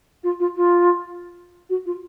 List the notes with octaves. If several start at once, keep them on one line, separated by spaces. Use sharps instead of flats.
F4
F4
F4
F#4
F4